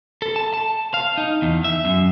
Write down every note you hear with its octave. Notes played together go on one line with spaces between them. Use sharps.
A4
A5
A5
F5
D#4
E2
E5
F#2